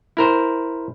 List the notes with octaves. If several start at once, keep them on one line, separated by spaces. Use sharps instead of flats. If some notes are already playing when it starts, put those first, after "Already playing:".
E4 A#4 C5